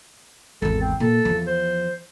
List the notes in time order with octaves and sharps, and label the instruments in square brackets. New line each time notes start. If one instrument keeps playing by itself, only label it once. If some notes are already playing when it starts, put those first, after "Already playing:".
[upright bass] G#1 E2 [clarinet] A4
[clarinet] C4
[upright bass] A#2 [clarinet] A4
[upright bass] E2 F3
[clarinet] C5